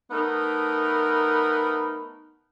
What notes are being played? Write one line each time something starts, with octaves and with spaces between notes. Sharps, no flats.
A3 B3 D#4 A#4